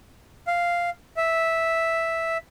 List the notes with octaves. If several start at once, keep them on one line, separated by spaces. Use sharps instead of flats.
F5
E5